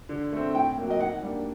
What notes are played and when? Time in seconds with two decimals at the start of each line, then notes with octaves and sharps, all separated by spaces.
0.09 D3
0.33 A3 C4
0.54 A2 G5
0.78 F#3 A#3
0.90 D#5
0.99 D#3 F#5
1.23 G3 A#3 D4